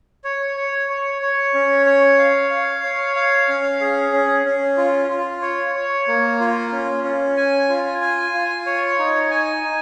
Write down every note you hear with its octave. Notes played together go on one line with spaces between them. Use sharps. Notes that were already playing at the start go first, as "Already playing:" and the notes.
C#5
C#5
C#5
C#5
C#4
C#5
F5
F5
C#5
F5
C#4
G#4
C#4
C#4
F4
F4
C#5
C#5
A#3
F4
C#4
C#4
G#5
F4
G#5
F4
C#5
D#4
G#5
D#4